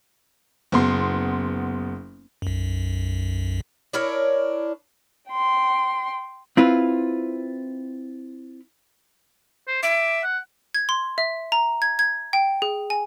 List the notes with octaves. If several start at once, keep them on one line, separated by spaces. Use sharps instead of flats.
F#1 B3 C6
B1 F#2
D4 E4 A#4 C#5
G5 C6
C4 E4 F4 B4
C5
E5 D6
F#5
G#6
C6
E5
A#5
G#6
G#6
G5
G#4
G#5